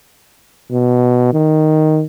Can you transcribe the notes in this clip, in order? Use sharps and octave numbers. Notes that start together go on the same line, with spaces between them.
B2
D#3